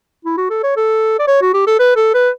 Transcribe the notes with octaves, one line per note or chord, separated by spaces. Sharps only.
E4
F#4
A4
C#5
A4
D5
C#5
F#4
G4
A4
B4
A4
B4